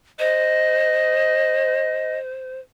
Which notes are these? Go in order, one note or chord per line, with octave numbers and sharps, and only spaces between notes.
C5 D#5